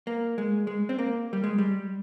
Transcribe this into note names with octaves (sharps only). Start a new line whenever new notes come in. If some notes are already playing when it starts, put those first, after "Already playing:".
A#3
G#3
G#3
C4
A#3
G3
G#3
G3